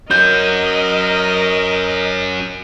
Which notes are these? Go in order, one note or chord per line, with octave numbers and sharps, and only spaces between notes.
C#4 F#4 A#4 D#5 G6